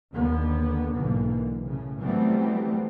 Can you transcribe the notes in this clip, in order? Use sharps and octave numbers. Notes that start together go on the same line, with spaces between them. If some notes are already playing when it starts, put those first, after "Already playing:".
D#2 D3 B3
B1 G#2 D3 E3 A#3
A2 C#3
E3 F#3 G3 A3 B3 C4